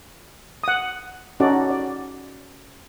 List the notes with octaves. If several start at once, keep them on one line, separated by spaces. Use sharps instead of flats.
F#5 D#6
C#4 D#4 F#4 A4 D5
D5